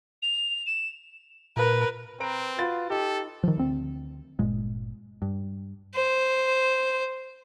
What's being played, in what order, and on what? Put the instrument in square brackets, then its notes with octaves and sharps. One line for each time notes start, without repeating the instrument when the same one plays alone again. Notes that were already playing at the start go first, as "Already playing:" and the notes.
[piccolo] F7
E7
[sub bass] A#2 [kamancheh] A#4 B4
[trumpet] C4 [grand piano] B4 A#5 D7
[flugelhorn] F4 [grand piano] F#4 B4 A6
[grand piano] D#4 [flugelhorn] G4 [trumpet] A4
[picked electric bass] D#3 F3
D2 C4
G1 A#2 G#3
G2
[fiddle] C5